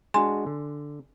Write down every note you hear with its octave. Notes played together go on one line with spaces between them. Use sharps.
G#3 D4 F#4 G#5 C6
D3